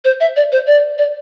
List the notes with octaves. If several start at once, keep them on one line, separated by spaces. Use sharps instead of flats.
C5
E5
D5
C5
D5
D5